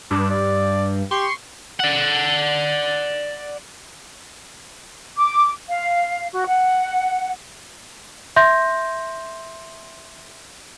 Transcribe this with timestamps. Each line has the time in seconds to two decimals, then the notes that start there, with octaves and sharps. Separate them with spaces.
0.11 G2 D4
0.30 D5
1.11 G4 C6 C#6
1.80 D5 F#5
5.16 D6
5.69 F5
6.32 F#4
6.46 F#5
8.36 E5 C6 G6 A#6